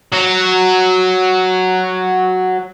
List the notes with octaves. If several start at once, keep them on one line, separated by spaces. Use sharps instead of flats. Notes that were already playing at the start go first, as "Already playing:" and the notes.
F#3 F#4